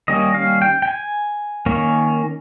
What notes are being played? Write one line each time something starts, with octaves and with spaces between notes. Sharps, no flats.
D#3 G3 A#3 C#4 D#5
F5
G5
G5
G#5
D#3 A#3 C#4